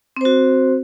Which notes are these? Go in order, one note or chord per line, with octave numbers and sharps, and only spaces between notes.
C4 F#4 C5